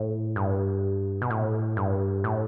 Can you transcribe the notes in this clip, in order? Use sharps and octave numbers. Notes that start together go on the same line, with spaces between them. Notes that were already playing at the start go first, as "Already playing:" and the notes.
Already playing: A2
G2
B2
A2
G2
A2